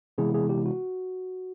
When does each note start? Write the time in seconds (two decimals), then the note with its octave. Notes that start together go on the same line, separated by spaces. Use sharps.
0.18 C3 E3 G#3 B3 E4 G#4
0.34 G#4
0.49 G4
0.66 F#4